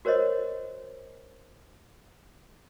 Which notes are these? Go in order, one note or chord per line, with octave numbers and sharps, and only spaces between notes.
F#4 A#4 C5 C#5 D#5